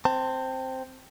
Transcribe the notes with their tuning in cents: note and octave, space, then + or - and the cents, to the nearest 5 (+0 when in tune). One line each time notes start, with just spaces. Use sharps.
C4 +0 A5 +25